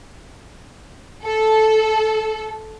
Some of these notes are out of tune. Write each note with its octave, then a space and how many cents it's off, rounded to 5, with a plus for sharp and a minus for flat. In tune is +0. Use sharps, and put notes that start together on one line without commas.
A4 -10